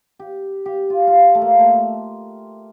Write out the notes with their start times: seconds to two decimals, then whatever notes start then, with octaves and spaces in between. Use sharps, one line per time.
0.19 G4
0.66 G4
0.90 F4
1.07 F4
1.35 A3
1.42 A#3
1.60 A3